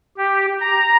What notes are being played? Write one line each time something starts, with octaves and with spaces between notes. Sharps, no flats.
G4
A#5